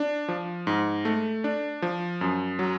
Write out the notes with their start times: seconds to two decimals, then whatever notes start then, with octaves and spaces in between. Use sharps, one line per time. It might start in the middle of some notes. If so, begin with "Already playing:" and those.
Already playing: D4
0.28 F3
0.67 G#2
1.05 A3
1.44 D4
1.82 F3
2.21 F#2
2.59 F#3